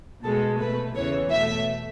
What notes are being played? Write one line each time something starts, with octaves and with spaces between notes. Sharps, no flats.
B2 G#3 A4
B2 A3 B4
E2 C#3 E3 C#5
B2 A3 E5